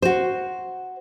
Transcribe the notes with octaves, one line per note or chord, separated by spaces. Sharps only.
F#4 C5